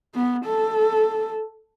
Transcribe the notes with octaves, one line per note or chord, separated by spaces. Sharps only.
B3
A4